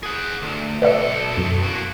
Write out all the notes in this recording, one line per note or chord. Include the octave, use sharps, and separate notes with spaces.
G#4 F#5
D2
B1 A4 B4 D5 E5
F#2
A#3 F#4